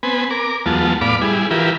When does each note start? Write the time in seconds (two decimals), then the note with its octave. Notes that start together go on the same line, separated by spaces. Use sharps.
0.03 B3 C4 B4 G#5
0.31 A#4 D6
0.66 E2 F#3 G#3 B3 F4 A5
1.01 A2 B3 D5 F5 B5 D6
1.21 G3 E4 G#4
1.51 E3 E4 F4 G4 A#4 B4